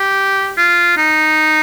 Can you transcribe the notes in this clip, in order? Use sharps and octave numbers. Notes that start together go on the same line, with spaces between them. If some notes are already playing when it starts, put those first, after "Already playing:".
Already playing: G4
F4
D#4